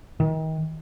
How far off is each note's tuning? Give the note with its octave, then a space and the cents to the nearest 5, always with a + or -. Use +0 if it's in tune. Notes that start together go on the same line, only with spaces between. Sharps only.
D#3 +35